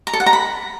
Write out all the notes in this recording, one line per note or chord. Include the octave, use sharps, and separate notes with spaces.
A#5
A4
F#5
A#5
B5